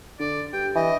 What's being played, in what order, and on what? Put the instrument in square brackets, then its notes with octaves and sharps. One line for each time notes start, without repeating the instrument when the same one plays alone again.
[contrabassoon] D3 [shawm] D5
[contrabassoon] G2 [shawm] G5
[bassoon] E3 [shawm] D#5